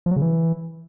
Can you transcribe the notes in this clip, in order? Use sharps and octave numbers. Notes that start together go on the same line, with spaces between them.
F3
F#3
C#3
E3